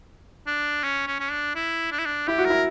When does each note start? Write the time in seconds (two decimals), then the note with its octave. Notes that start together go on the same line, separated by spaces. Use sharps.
0.47 D4
0.84 C#4
1.07 C#4
1.20 C#4
1.31 D4
1.56 E4
1.92 D4
1.98 E4
2.05 D4
2.27 E4 G4
2.38 F#4
2.45 E4 A#4